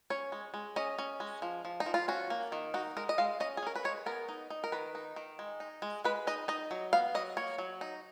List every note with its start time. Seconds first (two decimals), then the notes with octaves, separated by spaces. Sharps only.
0.10 C#4 C#5
0.32 G#3
0.54 G#3
0.76 C#4 D#5
0.99 C#4
1.20 G#3
1.42 F3
1.65 F3
1.80 D#4
1.86 F3
1.94 F4
2.08 C#4 F#4
2.30 A#3
2.52 D#3
2.74 D#4 F#4
2.97 G#3 A#4
3.09 D#5
3.18 G#3 F5
3.40 C#4 D#5
3.57 G#4
3.63 C#4 A#4
3.76 B4
3.85 G#3 C#5
4.06 B3 A#4
4.29 D#4
4.50 D#4
4.64 A#4
4.72 D#3 B4
4.95 D#4
5.16 D#3
5.39 G#3
5.60 D#4
5.82 G#3
6.04 G#3 B4
6.27 D#4 D#5
6.48 D#4 D#5
6.71 F#3
6.93 B3 F5
7.15 F#3 D#5
7.37 A#3 C#5
7.58 F#3
7.81 D#4